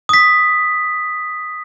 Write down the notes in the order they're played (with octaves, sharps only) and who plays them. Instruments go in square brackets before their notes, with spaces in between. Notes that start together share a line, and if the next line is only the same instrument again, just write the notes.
[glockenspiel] D#6 B6